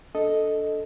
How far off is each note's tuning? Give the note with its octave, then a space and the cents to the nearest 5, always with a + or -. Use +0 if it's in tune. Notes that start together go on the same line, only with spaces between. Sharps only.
D4 +0 A4 +0 D#5 +0